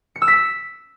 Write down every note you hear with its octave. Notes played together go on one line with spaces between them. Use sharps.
C#7
E6
B6